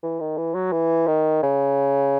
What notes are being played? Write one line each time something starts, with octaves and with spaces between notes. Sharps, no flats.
E3
D#3
E3
F#3
E3
D#3
C#3